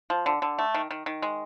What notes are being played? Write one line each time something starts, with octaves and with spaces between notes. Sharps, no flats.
F3
D3
D3
A3
D#3
D#3
D#3
G#3